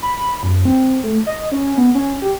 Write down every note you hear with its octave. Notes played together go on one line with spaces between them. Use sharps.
B5
F#2
C4
A3
D#5
C#4
B3
C#4
G4